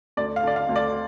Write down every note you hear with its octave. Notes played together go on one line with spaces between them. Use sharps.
D2 D5
F5
D3 D5
F5
D2
D5